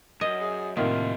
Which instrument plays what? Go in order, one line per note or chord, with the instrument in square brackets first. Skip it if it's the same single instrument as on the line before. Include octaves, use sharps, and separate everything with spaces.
[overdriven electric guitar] F#2 [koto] D#5
[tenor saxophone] G#4
[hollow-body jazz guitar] A2 C3 A#3 [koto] D#3 [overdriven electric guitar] F3 E5 [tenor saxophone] F4